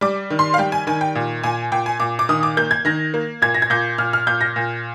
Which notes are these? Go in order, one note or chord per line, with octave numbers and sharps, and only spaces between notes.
G3 D6
D#3
C6
F5
G3 G5
G#5
D#3 G#5
G5
A#2
A#2 G#5
A#2 G5
G#5
A#2 D6
D6
D#3 D#6
D6
A#3 G6
G#6
D#3 A#6
A#3
A#2 G#6
A#6
G#6
A#2 G6
A#2 F6
F6
A#2 G6
A#6
A#2